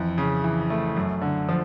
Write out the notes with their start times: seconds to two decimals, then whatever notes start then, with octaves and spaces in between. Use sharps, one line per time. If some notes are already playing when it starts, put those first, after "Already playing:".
Already playing: F2 E3
0.18 C#3
0.44 E3
0.70 A3
0.96 F#2
1.22 D3
1.49 F3